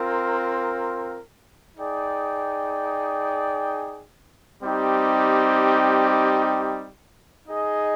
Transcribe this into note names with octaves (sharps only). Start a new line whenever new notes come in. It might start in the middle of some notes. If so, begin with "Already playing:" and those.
Already playing: C4 F4 A#4
D#4 G#4 D5 G5
G3 C4 D#4 G4
D#4 G#4 D#5